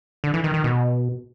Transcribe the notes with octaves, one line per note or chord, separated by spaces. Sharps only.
D3
E3
D#3
D#3
B2